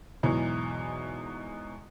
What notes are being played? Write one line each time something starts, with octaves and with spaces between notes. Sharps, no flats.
E2 G#2 B2 E3 F#3